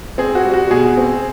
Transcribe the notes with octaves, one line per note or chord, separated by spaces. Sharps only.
C4 G#4
F#4
G3
F#4
B2 G#4
C4